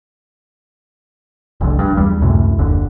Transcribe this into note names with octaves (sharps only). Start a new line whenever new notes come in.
F1 C2 D3
G2
E2 G3
C#2 F#2 A2 C3
F#1 D#2 D3